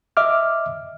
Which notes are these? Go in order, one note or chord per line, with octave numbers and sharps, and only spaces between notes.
D#5 E5 D6 F6